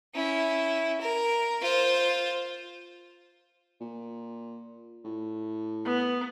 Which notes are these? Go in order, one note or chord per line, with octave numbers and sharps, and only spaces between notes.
C#4 E4
A#4
F4 C5
A#2
A2
B3